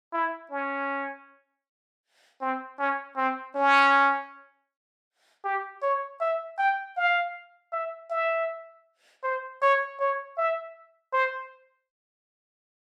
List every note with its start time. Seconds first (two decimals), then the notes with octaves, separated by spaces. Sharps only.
0.13 E4
0.51 C#4
2.41 C4
2.79 C#4
3.17 C4
3.55 C#4
5.44 G4
5.82 C#5
6.21 E5
6.59 G5
6.97 F5
7.72 E5
8.10 E5
9.24 C5
9.62 C#5
10.00 C#5
10.38 E5
11.13 C5